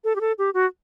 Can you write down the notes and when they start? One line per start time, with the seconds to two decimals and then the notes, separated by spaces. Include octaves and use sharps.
0.04 A4
0.16 G4
0.21 A4
0.38 G4
0.54 F#4